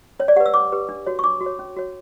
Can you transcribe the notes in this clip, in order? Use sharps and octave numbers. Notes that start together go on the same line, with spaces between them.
C#4 C#5
D5
G4 B4 F#5
E6
C#4 D6
G4 B4
D4
F#4 C#5
C#6
D4 D6
F#4
C#5
C#4
F#4 C#5